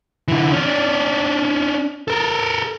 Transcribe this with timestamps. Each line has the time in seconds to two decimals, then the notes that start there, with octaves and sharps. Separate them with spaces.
0.28 D3 E3
0.52 C#4 D4
2.08 A4 A#4